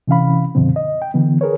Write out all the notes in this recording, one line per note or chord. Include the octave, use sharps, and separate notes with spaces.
C3 E3 C#4 F5 B5
F#2 B2 D3 F3 C4
D#5
G5
D3 E3 B3
G#4 A#4 B4 C#5